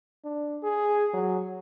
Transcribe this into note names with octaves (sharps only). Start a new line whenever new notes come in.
D4
G#4
F#3